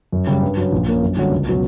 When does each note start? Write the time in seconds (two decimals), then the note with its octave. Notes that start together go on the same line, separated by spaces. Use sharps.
0.12 F#2
0.27 C#3 G3
0.42 G2
0.57 F#3 C#4
0.72 A#1
0.87 A#2 A#3 C#4
1.02 F#2
1.17 D3 G3 C#4 F#4
1.31 C#2
1.47 B2 F#3 C#4